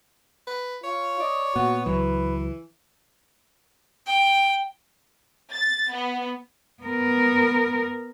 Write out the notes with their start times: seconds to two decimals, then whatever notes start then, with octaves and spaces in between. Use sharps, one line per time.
0.47 B4
0.84 F4 C#5
1.20 D5 D#5
1.56 A#2 B3 F#4
1.86 C#2 E3 F#3 B4
4.06 G5
5.51 A6
5.92 B3
6.83 B3 A#4